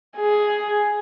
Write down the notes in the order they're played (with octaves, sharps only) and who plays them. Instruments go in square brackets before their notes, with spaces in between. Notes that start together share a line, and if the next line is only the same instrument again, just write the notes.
[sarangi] G#4